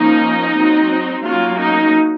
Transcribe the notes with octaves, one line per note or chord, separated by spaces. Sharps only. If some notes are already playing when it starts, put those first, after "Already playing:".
Already playing: F3 A#3 C#4 D#4
F#3 C4
F#3 A#3 C#4 F4
D#4